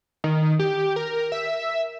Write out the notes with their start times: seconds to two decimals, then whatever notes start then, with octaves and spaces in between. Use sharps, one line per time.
0.24 D#3
0.59 G4
0.96 A#4
1.32 E5